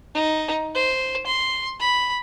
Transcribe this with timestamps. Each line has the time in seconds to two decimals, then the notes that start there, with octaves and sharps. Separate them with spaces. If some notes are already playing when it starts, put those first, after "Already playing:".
0.15 D#4
0.75 C5
1.27 C6
1.80 B5